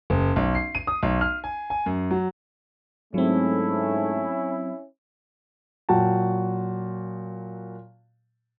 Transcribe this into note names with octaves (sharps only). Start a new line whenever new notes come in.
F#1
B1
C7
D#7
D#6
B1
F6
G#5
G#5
F#2
F#3
G#2 F#3 A3 C4 C#4 E4
A#2 F#3 F#4 G5 A5